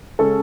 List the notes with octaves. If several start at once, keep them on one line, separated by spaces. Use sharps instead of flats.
C#3 G#3 C#4 A4